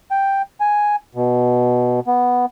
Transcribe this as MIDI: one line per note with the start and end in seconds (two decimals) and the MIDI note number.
0.11 0.42 79
0.60 0.96 80
1.15 2.00 47
2.07 2.46 59